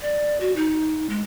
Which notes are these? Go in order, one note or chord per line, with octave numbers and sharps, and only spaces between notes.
D5
F#4
D#4
G#3